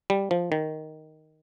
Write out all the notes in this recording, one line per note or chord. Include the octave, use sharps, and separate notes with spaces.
G3
F3
D#3